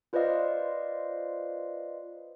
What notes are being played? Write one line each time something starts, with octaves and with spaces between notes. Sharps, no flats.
F4 B4 C5 D5 D#5 F5